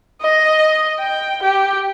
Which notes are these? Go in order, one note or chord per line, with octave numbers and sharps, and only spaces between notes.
D#5
G5
G4